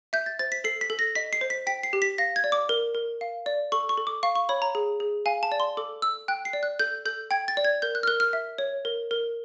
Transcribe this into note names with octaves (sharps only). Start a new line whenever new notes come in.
E5 G6
A6
C5 A6
B6
A4 C7
B6
A4
A#6
D#5 B6
C7
C5
B6
G5 B6
C7
G4
B6
F5 A#6
G#6
D5
D6
A#4
A#4
F5
D5
A4 C#6
C#6
A4
D6
F5 C#6
C#6
C#5 B5
A#5
G#4
G#4
F5 G#5
A5
D5
C6
A4 D6
A4 E6
G5 F#6
C7
D5
F#6
A4 G6
A4 G6
G5 G#6
A6
D5
G#6
A#4 G6
F#6
F6
A#4 F#6
F6
E5
C#5
A#4
A#4